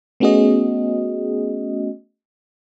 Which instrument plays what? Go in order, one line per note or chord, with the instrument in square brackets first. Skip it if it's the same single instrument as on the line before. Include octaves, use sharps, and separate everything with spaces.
[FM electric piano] A3 B3 C#4 F#4 G#4 D#5